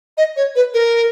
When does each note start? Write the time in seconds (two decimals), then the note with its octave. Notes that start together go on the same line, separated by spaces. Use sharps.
0.17 D#5
0.37 C#5
0.56 B4
0.74 A#4